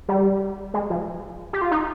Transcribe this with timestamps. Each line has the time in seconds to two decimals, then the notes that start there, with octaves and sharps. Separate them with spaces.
0.09 G3
0.74 G#3
0.90 F3
1.53 G4
1.62 F4
1.71 D#4